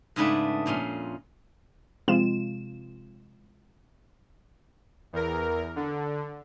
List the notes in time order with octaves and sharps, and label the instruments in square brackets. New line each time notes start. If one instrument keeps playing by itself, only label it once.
[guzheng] G#2 C#3 A3 B3 D4
F2 A#2 C#4 C6
[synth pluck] C3 F3 G#3 C4 F4 E7
[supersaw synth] E2 A#4
D3